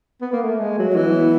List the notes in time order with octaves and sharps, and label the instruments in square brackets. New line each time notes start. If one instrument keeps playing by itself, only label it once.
[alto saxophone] B3
A#3
A3
G#3
F#3
[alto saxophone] E3 [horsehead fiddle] B3